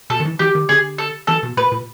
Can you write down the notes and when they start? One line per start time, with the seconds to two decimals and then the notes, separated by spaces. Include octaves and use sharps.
0.10 B2 A4
0.20 D#3
0.25 E3
0.39 E3 G4
0.55 D#3
0.69 D3 G#4
0.98 A4
1.27 E3 A4
1.43 B2
1.57 A#2 B4
1.72 A#2